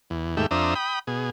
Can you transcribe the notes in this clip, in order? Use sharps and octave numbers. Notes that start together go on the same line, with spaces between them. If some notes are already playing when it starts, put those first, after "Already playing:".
E2
D#2 G#2 A3 G4 E5
F2 D4 C5 E5 A#5 D#6
G5 B5 D#6
B2 G#4